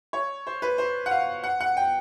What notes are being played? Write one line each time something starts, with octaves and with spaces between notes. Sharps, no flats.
C#5
C5
B4
C5
F#5
F5
F#5
F#5
G5